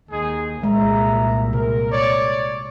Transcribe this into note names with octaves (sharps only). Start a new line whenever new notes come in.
D#2 G#3 D#4 G#4
C2 A#2 G#3 E5 A#5
C3 A#4
C#5 D5